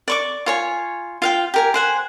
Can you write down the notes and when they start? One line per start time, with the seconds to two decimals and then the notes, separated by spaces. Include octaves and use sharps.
0.08 D5 C#6 D6
0.46 F4 C#5 G#5
1.22 F4 F5 G5
1.54 G4 A#4 G#5
1.74 C5 F#5 G#5